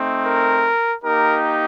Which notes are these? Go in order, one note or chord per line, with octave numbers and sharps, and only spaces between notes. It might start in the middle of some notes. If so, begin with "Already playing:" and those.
Already playing: A3 C4 D#4
A#4
A#3 D#4 G4 A#4